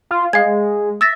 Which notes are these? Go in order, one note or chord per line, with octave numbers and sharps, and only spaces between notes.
F4
G#3 F5 G#6
E5 E6 A6 A#6